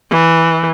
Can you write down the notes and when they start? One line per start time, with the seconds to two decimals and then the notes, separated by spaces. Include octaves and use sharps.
0.11 E3